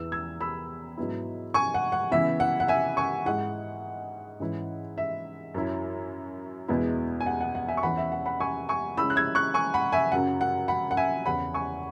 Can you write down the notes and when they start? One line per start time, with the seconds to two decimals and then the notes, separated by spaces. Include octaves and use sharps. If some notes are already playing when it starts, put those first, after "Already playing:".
Already playing: E2 E3 B3 E4 E6
0.12 E6 G#6
0.41 B5 E6
0.98 G#2 F#3 B3 E4
1.54 G#5 C#6
1.74 F#5
1.92 F#5
2.11 C#3 E3 B3 E4 E5
2.40 F#5
2.60 F#5
2.68 E5 G#5
2.97 G#5 C#6
3.26 G#2 G#3 E4 F#5
4.40 G#2 E3 C#4 E4
4.98 E5
5.54 F#2 F#3 C#4 E4
6.68 E2 B2 G#3 B3 E4
7.21 G#5
7.26 F#5
7.41 F#5
7.55 F#5
7.68 E5 G#5
7.77 C#6
7.83 E2 E3 C#4 F#5 B5
7.97 E5
8.12 F#5
8.26 F#5 B5
8.40 G#5 C#6
8.69 G#5 C#6
8.97 C#3 G#3 C#4 E4 B5 E6
9.10 F#6
9.16 E6 G#6
9.35 C#6 F#6
9.54 G#5 C#6
9.74 F#5 B5
9.92 E5 G#5
10.12 F#2 C#3 F#3 F#5
10.41 F#5
10.68 F#5 B5
10.91 F#5
10.97 E5 G#5
11.26 E2 C#3 E3 C#4 F#5 B5
11.54 G#5 C#6